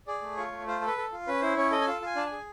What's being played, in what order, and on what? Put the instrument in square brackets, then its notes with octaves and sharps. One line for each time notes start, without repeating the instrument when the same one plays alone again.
[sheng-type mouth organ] G#4 D5
A3
F4 C#5
A3
F4 C5
A4
B4
A4
F4
C#4 B4
E4 C5
C#4 C#5
A4 D#5
G#5
F4 A5
F4 G#5
D4 A5
G#5
G#4